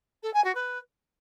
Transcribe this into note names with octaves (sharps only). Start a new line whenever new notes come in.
A4
G#5
F#4
B4